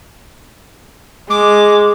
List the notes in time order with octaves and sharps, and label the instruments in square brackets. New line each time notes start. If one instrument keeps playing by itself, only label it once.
[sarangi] G#3 [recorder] D6